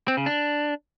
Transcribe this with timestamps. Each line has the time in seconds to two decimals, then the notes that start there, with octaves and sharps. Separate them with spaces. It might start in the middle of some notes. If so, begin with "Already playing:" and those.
0.08 C4
0.17 C#3
0.26 D4